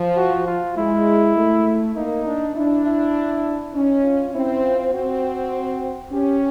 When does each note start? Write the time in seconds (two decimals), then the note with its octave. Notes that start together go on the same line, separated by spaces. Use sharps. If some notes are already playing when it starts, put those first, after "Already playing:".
Already playing: F3
0.16 F#4
0.46 F4
0.76 G#3 E4
1.36 A3
1.96 A#3 D#4
2.25 D4
2.55 D4 E4
2.85 E4
3.74 C#4 D#4
4.03 F4
4.34 C4 E4
4.63 F4
4.93 C4 F#4
6.12 C#4 G4